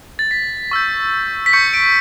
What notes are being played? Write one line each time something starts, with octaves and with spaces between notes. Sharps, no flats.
A6
B6
C#6 E6 G6
B6
C#6 G6 C#7
D7